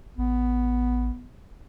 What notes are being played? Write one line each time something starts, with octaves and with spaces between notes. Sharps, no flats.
A1 B3